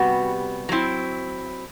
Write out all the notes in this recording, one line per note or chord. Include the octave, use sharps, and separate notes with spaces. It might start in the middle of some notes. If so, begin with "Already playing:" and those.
Already playing: C3 G3 B3 F#4
F#3 C4 E4